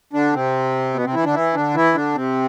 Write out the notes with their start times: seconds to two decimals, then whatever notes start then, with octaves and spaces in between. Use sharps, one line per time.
0.13 D3 D4
0.34 C3 C4
0.94 B2 B3
1.04 C3 C4
1.14 E3 E4
1.24 D3 D4
1.34 E3 E4
1.54 D3 D4
1.74 E3 E4
1.94 D3 D4
2.15 C3 C4